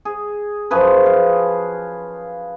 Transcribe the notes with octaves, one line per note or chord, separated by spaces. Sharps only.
G#4
F#2 F3 G#4 B4
F5